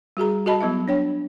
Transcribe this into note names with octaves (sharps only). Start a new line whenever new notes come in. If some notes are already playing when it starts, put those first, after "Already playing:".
G3 F#4 G#4 A#5
G3 F#4 A4 D#5 A5 B5
F#3 B3 E4 A4 E5
D4 C#5 G5